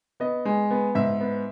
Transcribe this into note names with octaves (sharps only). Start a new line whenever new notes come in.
B3 D#5
G#3
B3
G#2 E5
B3